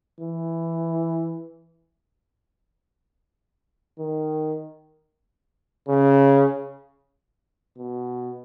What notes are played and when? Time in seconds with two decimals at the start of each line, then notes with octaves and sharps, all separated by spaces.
0.20 E3
3.98 D#3
5.88 C#3
7.77 B2